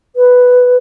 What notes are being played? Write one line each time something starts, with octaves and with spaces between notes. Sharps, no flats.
B4